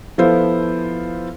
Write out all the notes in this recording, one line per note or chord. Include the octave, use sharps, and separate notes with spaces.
F3 B3 E4 F4 A4 C5